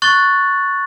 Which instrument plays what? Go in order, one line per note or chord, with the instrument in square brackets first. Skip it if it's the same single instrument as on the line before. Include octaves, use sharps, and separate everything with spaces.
[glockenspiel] C#6 F#6 A6 F#7